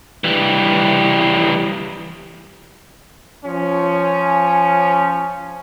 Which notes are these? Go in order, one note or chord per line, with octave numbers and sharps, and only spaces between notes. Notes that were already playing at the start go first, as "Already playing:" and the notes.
E3 G3
F3 C#4